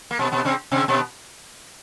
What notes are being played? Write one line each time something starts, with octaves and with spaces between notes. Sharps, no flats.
A#3
B2 B3
B2 B3
C3 C4
C3 C4
B2 B3